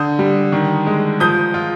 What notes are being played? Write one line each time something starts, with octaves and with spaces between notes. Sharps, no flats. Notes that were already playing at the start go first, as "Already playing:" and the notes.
Already playing: D3 D#6 G6
G3
D#3
G#3
F3 D#6 G6
F4